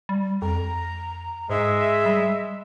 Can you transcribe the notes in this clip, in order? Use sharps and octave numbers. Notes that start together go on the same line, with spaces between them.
G3
F2 A#5
G#2 G#3 E5
G3